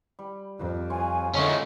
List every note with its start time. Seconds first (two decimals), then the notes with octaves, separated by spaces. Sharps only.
0.19 G3
0.60 F2
0.90 F4 F#4 C#5 G#5
1.35 D3 A3 C#4 G#4 A#4 D#5 B5 C#6